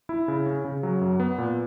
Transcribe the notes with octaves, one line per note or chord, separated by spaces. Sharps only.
E4
C#3
C#4
C#3
F#3
F#2
B3
A#2